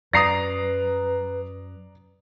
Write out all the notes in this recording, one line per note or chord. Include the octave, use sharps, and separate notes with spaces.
F#2 B4 D5 A#5 D#6 A#6 C7 F7